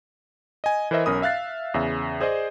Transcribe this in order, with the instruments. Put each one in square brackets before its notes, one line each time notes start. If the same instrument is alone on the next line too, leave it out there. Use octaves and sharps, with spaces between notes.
[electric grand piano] D#5 G#5
E3 A#4 C5 D#5 E5
B1 C#4 A#4 B5 D#6
E5 F5 F#6 A6 C7
E2 C#3 E5
G#4 C5 D5 D#5